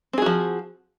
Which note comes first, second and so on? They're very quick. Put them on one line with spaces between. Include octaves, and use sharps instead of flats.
C4 G#4 F#4 F3